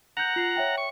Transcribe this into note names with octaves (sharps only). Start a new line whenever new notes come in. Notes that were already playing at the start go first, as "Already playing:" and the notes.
F#5 A#5 G6 C#7 F7
F4 C7 F7
C#5 E5 G5
C#6